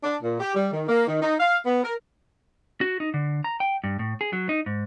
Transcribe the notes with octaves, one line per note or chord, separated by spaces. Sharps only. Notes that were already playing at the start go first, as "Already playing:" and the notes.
D4
A#2
G4
G3
D#3
A#3
D#3
D#4
F5
B3
A#4
F#4
D#4
D3
A#5
G5
G2
A2
G#4
F#3
D#4
G#2